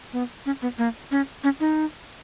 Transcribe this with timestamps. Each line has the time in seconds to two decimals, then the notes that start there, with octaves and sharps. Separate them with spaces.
0.13 B3
0.46 C#4
0.62 B3
0.78 A#3
1.11 C#4
1.44 C#4
1.60 D#4